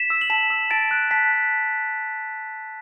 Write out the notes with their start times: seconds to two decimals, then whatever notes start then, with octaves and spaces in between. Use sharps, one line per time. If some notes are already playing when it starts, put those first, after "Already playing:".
Already playing: B6 E7
0.10 E6
0.21 F#7
0.30 A5 B6 E7
0.50 E6
0.70 A5 A6 D7
0.91 F#6
1.11 A5 B6
1.32 F#6